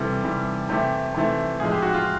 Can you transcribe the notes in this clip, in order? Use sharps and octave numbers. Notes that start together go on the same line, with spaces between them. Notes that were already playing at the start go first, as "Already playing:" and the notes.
Already playing: C3 E3 G3 A4
C3 E3 G3
C3 E3 A3 G4
C3 E3 A3
A2 F3 G#3 G#4
G4
F#4
F4